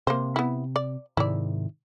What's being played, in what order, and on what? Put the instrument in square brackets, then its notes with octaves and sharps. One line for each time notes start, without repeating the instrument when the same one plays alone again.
[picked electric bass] C3 [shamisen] A#3 C5
[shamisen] B3 E4
D5
[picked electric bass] G#2 C3 D#3 [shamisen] E4 D5